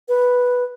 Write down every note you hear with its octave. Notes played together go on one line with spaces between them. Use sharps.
B4